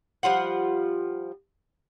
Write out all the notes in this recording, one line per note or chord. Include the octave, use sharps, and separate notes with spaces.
F3 G3 F4 F#5